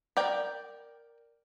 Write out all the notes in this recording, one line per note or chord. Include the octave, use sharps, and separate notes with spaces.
A#4 D5 G5